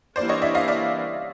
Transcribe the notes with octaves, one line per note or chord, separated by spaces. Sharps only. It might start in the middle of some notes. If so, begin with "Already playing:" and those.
E3 G3 A#3 D4 C5 D5
C#5 D#5
D5 E5
D#5 F5
D5 E5